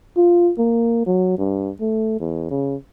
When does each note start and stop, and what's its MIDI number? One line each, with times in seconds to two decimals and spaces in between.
0.17 0.51 65
0.58 1.04 58
1.06 1.34 54
1.38 1.71 43
1.80 2.19 57
2.20 2.48 40
2.51 2.75 49